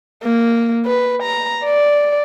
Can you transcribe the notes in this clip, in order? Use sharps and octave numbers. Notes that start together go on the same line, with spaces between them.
A#3
B4
A#5
D5